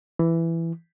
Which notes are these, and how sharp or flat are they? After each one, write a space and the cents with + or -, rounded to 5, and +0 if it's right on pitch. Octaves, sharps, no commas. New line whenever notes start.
E3 +10